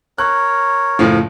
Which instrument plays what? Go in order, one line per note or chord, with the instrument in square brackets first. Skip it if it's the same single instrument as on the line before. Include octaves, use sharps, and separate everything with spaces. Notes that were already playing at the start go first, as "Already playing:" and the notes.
[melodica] A#4 C#5 [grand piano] F#6
[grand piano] F#1 A2 F3